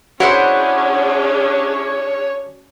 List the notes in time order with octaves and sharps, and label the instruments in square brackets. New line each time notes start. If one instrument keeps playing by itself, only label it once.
[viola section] C#4 D4 G#4 [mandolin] E4 C5 F#5 [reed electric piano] F#4 [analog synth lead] C#5